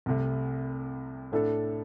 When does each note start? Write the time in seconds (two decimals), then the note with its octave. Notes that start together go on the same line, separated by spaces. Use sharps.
0.06 C2 C3 A3
1.32 A2 A3 D4 A4